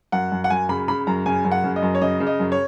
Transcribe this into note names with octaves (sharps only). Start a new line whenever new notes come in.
F#2 F#5
F#2
F#5
F#2 G#5
C#3 B5
C#3 B5
F#2 A#5
C#3 G#5
F#2
F#5
C#3
D#5
F#2
C#5
C#3 D#5
C#3
D#5
F#2
C#5